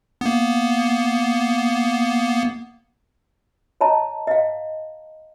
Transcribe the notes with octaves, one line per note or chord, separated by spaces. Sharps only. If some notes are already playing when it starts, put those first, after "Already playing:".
A#3 B3
C#5 D#5 A5 A#5
D#5 F5